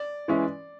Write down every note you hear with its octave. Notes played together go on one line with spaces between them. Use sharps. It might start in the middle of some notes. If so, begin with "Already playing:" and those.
Already playing: D5
E3 G#3 C#4 E4